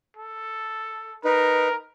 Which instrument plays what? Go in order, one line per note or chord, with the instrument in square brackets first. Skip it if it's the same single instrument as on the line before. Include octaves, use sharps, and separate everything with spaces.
[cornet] A4
[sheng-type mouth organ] D#4 B4 [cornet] A#4